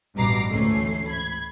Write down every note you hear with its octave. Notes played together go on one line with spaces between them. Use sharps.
A1 G2 B2 A#5 D6 C7
D2 G#2 E3 A3 C#4 C7
B5 G#6